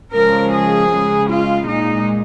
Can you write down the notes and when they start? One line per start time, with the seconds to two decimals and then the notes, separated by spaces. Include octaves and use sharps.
0.14 C#3 F3 G#3 A#4
0.53 G#4
0.91 C#3 G#3
1.30 F4
1.67 A#2 G#3 D#4